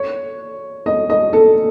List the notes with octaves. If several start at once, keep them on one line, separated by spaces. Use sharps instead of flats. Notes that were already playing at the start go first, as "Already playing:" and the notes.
Already playing: C#5
D#5
D#5
A4